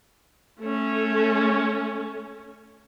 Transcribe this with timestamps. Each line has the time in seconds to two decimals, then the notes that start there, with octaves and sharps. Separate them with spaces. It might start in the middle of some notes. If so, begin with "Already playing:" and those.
0.60 A3 C#4